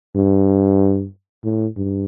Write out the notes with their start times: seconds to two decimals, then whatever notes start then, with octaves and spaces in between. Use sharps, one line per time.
0.15 G2
1.44 A2
1.77 G2